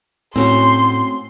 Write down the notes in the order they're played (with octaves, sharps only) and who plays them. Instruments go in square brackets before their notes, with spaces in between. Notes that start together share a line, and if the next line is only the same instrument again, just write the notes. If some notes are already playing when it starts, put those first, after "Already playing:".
[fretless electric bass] A2 [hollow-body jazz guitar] C4 C#4 F#4 [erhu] C6